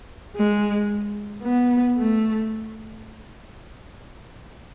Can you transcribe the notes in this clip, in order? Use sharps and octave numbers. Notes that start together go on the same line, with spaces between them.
G#3
B3
A3